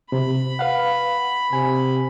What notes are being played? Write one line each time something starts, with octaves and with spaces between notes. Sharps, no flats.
C3 B5
B4 F5 F#5
C3 G#5